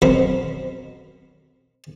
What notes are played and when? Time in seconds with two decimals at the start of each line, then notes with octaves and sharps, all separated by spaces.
0.02 F#2 B2 F#3 C4 A#4 B5